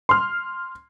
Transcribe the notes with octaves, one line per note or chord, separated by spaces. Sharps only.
C6 F6